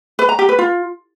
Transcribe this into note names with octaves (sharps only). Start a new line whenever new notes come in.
B4
A#5
G4
B4
F4